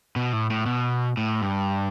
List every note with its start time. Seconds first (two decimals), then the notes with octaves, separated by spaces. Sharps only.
0.16 B2
0.33 A2
0.50 A2
0.66 B2
1.17 A2
1.42 G2